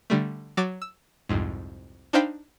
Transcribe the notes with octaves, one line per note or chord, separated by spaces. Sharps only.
D3 G3 A3
F#3 F#4 D6 A6
E6
C2 F2 G#2
D4 D#4 C5 F5 G5 B5